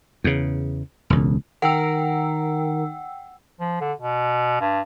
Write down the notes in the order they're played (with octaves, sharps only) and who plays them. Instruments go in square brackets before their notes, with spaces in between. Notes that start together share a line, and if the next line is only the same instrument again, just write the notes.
[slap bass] E2 C#3
E1 C#2
[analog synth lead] D#3 [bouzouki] A#4 [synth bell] F#5 G5 E6
[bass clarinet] F3
D3
B2
G2